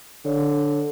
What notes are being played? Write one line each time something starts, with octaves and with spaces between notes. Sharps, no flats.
D3 C#5